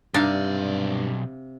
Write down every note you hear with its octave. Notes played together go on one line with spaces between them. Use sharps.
B1 G2 C3 D4 D#4 D5 F5